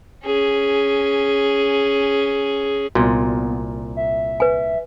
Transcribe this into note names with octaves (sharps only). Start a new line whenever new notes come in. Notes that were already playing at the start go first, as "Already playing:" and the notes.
C#4 G#4
C2 A#2 B3 F#4
E5
B4 G#5